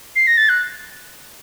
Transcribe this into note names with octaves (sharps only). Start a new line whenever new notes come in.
C7
A#6
A6
F#6